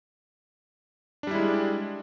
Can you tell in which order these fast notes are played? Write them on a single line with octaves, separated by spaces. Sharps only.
D4 G3 E4 G#3